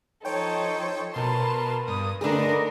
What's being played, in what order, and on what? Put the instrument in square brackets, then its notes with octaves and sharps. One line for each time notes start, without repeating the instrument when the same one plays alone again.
[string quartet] F3 D#4 A4 [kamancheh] C5 [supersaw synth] C#5 G5
[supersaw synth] B2 C6 [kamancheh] A#4 B4 [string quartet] A5
[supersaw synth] G2 [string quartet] D#6
[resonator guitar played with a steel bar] D3 G#4 [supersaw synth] A3 A#6 [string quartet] D#4 A#4 [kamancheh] B4 D5